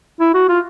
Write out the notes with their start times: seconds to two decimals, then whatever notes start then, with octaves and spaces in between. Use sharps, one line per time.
0.20 E4
0.34 F#4
0.49 F4